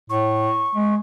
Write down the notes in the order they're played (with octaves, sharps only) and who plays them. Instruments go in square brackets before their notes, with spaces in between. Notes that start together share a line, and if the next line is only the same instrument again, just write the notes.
[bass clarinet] A2 [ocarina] C#6
[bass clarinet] G#3